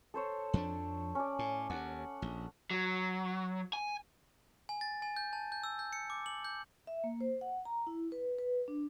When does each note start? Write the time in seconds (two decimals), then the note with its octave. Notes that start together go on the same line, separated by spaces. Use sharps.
0.14 A4 C5 C#5
0.53 F2 F3 D4
1.15 C#4 D5
1.39 A2
1.70 D#2 F#5
2.22 A#1
2.71 F#3
3.73 G#5
4.69 G#5
4.81 A6
5.02 G#5
5.16 G6
5.33 A5
5.52 G6
5.64 E6
5.79 G6
5.93 C#7
6.10 D6
6.26 F#7
6.44 G6
6.87 E5
7.04 A#3
7.21 C5
7.41 F#5
7.65 A#5
7.87 E4
8.12 B4
8.39 B4
8.68 D4